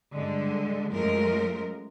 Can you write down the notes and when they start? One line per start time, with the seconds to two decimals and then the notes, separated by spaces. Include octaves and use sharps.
0.14 G2 D3 G#3
0.92 F#2 F3 G#3 A3 A#4